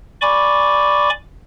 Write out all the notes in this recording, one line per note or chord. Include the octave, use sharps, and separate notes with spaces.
D5 G#5 B5 C#6 D6